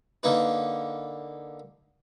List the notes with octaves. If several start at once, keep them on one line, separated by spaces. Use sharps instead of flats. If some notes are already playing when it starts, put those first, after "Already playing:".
D3 A#3 D#4 B4